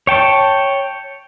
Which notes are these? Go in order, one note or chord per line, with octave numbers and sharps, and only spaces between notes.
C#5 G5 A5